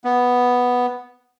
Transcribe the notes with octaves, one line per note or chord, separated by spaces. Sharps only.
B3